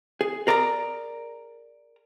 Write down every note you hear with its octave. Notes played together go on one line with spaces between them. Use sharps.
G#4
G#4 A#4 D5 E5 A#5